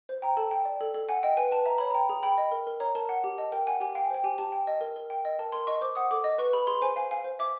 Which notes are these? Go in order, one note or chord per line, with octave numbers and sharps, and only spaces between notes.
C5
G5 A#5
A4 A5
G5
D5
A4
A4
F#5 G#5
D#5 G5
B4 G#5
B4 A5
E5 A#5
C#5 B5
G5 A#5
G#4
G5 B5
D#5
A#4
A#4
C#5 A#5
A#4 A5
F#5
G4
D#5 A5
A#4 G5
F#5 G#5
G4 G#5
F5 G5
G#5
C5 G5
G4 G#5
G4 A5
G5
D#5
A#4
A#4
G5
D#5
A#4 A5
A#4 C6
D#5 C#6
C5 D6
F#5 D#6
A4 D6
D#5
B4 C#6
G#4 B5
G#4 C6
C5 G#5
F5 G#5
F5 G#5
C5
E5 D6